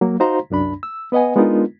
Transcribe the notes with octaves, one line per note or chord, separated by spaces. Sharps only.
F#3 A#3
D#4 F#4 C5 F5 A#5 C6
C2 F#2 D4 B5
E6
B3 B4 D#5 F#5 G#5
G#3 B3 D4 D#4 F4 A#4